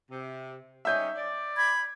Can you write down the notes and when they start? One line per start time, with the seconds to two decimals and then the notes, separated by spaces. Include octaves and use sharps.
0.10 C3
0.85 G3 C#4 D#4 E5 G6
1.16 D5
1.56 B5 G#6